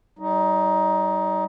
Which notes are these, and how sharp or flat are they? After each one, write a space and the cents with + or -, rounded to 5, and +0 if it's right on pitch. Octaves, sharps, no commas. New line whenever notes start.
G3 -30 D#4 +15